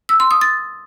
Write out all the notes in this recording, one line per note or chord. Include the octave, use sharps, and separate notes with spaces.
E6
C6
D#6
A6